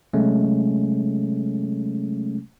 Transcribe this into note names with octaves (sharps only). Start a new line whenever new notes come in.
C3 F#3 G#3 A3 C#4